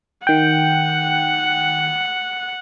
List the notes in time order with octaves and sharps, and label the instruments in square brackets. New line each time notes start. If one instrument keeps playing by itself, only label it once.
[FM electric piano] D#3 G5 [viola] F#5